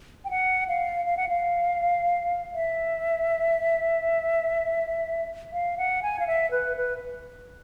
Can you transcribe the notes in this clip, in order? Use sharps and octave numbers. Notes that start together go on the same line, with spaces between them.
G5
F#5
F5
F5
F#5
F5
E5
F5
F#5
G#5
F5
E5
B4
B4